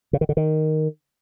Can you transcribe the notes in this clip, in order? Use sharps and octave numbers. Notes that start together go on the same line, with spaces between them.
C#3
D#3
D3
D#3